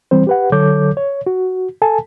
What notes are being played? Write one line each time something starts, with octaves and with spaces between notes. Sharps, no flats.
E3 G3 C4 C5
G4 B4 F#5
D3 F#3 A4 C#5 D6 G6
C#5
F#4
A4 G#5 A5